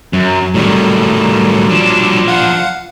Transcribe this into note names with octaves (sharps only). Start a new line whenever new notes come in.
F#2 F#3
A2 D#3 F#3 G3
F3 D4
F5 F#5